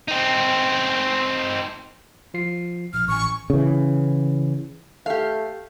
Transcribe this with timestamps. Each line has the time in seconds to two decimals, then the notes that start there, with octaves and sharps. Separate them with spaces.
0.08 C4 D#4
2.34 F3 F4 C7
2.94 A#1 F6
3.08 A1 G#5 C#6
3.50 C#3 E3
5.06 A3 G4 F5